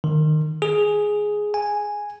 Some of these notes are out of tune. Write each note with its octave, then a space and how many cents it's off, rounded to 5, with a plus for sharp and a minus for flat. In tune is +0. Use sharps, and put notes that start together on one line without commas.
D#3 -20
G#4 +5
G#5 -5